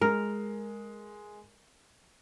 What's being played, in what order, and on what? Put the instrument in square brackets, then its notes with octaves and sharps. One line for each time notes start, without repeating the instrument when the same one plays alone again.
[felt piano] G#3 [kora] A#4